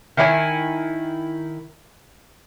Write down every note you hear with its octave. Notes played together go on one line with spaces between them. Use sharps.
D#3 E4 D5 G#5